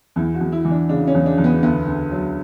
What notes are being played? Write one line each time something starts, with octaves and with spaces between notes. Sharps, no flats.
E2 E4
F#4
E2
E4
E3
D4
C#3 D4
C#4
E2
D4
E2
B3
D2 B3
D2
F#3